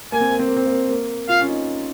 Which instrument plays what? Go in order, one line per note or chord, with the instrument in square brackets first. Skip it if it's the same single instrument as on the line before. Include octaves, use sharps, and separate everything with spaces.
[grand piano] A#3 [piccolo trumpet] G#5
[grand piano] C4
A#3
C4
A#3
C4
A#3
A#3
[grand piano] F4 [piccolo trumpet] F5
[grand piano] C#4
D#4